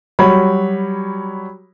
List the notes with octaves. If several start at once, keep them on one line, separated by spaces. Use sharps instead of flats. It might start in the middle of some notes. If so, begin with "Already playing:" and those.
F#3 G3 C#5 B5